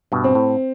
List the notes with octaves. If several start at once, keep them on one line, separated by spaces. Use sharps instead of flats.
G2 B2
C4
A2